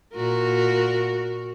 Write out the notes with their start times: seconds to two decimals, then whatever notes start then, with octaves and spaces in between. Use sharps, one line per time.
0.15 A#2 F#4 A#4